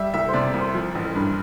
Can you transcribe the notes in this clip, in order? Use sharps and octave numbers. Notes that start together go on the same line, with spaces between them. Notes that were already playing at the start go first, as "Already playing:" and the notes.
Already playing: G3 E5
C2 E5
C5
C3 D5
C2
C5
F3
A1
G2